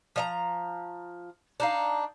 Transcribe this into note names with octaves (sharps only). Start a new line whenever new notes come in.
F3 D#5 A#5
D4 D#4 F5